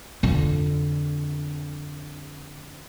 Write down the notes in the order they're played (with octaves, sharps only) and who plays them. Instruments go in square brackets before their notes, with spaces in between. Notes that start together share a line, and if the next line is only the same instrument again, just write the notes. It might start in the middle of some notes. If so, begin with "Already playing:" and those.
[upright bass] F2 D3